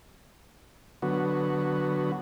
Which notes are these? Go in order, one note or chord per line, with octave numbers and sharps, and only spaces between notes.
D3 F#3 B3 F#4